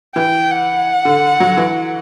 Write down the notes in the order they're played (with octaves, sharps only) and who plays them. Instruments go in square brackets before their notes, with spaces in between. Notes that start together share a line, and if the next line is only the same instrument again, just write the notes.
[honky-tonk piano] E3 [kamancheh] G5
[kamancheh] F#5
[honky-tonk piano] D3
F#3
E3